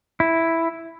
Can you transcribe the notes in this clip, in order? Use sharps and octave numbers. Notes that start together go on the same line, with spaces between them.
E4